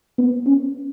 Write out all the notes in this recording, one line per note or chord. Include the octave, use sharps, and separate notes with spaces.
B3
C#4